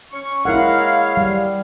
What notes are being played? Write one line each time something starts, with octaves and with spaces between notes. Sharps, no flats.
C#4 C#6
G#3 E4 A#4 C#5 F5 F#5
G3